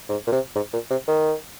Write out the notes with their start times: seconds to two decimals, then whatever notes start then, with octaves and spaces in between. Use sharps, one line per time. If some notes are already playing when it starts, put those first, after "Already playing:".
0.09 G#2
0.27 A#2
0.32 C3
0.55 G#2
0.73 A#2
0.91 C3
1.08 D#3